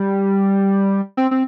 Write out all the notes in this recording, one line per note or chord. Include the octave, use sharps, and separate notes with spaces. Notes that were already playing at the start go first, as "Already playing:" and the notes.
Already playing: G3
C4
C4